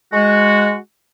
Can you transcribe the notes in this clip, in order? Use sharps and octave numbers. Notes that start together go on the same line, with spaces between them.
G#3 F#4